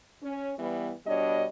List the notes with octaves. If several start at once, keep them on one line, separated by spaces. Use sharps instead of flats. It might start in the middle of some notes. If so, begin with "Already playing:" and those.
C#4
E3 G3 B3
B2 G3 D4 C#5 D#5